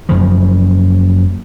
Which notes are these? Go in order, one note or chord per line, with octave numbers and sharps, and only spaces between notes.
F#1 F#2 C#3 F3